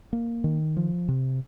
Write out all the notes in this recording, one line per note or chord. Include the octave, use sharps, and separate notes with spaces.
A#3
D#3
F3
C3